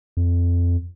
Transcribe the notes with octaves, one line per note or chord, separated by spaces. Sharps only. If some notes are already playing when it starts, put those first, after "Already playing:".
F2